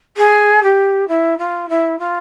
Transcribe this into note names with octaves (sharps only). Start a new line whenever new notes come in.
G#4
G4
E4
F4
E4
F4